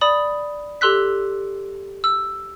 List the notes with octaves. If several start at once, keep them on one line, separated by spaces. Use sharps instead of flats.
D5 B5 D#6 F#7
G4 A4 C6 E6 F#6 B6
E6